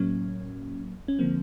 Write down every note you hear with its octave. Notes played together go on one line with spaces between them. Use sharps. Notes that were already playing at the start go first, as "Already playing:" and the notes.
Already playing: A2 F#3 A#3 C#4
C#4
D3 F3 A#3 C4